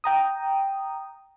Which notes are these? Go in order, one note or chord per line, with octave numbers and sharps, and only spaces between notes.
G5 A#5 D#6